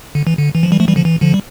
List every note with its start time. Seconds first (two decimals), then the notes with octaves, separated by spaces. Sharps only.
0.15 D3
0.27 E3
0.38 D3
0.55 E3
0.63 F3
0.72 E3 G3
0.80 F3 A3
0.88 E3 G3
0.96 D3 F3
1.05 E3
1.21 D3 F3
1.34 G3